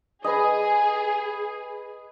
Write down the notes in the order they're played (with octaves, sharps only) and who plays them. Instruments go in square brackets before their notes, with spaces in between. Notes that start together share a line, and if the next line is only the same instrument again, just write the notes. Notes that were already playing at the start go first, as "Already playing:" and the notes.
[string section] G#4 [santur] B4 D#5